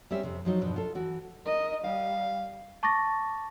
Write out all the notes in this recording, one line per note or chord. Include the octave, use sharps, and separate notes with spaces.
G3 C4 C#4 E5
F2 C3
F3 F#3 D#4 F4
E2 G2 B2 F3 D#4
F4 A4
E3 F#4
A#4 D#5
G3 F5
A5 C#6 D6 A6 A#6